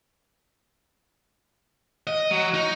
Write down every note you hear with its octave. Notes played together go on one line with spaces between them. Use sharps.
D#5
F#3
D#4